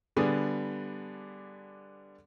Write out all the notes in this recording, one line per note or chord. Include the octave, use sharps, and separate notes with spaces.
D3 G3 B3 D4 G#4